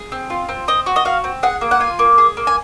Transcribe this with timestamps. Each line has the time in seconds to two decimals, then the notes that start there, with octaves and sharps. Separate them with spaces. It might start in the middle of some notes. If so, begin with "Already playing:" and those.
Already playing: G#4
0.12 C4
0.30 F4
0.49 C4
0.68 C4 D#5
0.86 F#4
0.96 D#5
1.05 F#4 F5
1.24 C4
1.43 G#4 F#5
1.61 A#3
1.71 F#5
1.80 F4 G#5
1.99 A#3
2.18 G#4
2.37 A#3
2.47 G#5